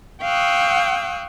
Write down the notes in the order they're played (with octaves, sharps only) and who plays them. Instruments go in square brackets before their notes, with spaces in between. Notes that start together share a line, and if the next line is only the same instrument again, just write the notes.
[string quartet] F5 G5 C#6 D#6 E6 F#6